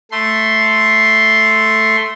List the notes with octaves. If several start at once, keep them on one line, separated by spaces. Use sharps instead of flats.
A3 C6